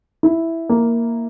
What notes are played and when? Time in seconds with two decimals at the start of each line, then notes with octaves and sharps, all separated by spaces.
0.23 E4
0.69 A#3